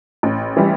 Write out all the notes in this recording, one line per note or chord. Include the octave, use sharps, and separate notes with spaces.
A1
E3 G3